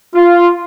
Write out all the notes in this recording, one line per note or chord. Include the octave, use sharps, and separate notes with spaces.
F4